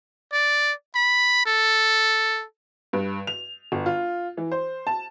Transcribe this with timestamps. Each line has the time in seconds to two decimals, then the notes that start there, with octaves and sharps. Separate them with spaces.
0.32 D5
0.95 B5
1.46 A4
2.93 G2
3.27 F7
3.72 G1
3.86 F4
4.37 E3
4.52 C5
4.87 A5